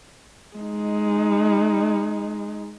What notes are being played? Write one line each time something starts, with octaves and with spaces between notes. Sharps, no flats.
G#3 D#4